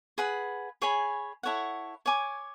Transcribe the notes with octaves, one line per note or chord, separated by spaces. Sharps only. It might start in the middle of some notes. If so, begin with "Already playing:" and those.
G#4 B4 F#5 B5
G#4 C#5 G#5 B5
E4 A4 C#5 F#5
C#5 G#5 D6